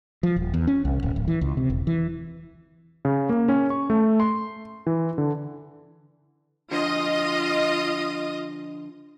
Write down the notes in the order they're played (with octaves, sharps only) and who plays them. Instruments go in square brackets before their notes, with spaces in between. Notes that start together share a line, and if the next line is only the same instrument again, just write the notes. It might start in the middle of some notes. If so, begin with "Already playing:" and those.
[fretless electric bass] F3
D#1
E2
C#4
C2
D1
D1
E3
C#2
C3
E1
E3
[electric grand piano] C#3
A#3
C#4
C#6
A3
C6
E3
D3
[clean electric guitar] D3 F3 [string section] F4 D#5 D#6